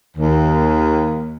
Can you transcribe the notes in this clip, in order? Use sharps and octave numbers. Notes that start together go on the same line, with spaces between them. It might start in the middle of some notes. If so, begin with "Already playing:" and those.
D#2